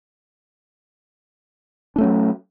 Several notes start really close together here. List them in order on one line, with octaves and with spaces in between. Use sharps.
D4 A3 C#4 F#3